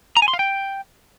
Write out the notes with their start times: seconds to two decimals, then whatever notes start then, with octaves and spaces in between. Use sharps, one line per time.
0.17 A#5
0.22 G#5
0.28 C6
0.34 F5
0.39 G5